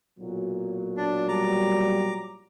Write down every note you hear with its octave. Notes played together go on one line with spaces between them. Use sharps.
B1 A#2 F#3
D4
G3 A#5 D6